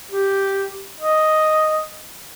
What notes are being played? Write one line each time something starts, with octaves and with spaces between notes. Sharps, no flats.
G4
D#5